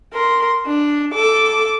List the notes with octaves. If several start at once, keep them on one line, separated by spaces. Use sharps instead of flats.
A#4 C6
D4
A4 D6